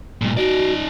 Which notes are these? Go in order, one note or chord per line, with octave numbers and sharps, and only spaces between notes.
G2 A#2
D#4 F#4 D5